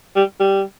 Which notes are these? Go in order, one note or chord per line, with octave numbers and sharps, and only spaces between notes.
G3
G3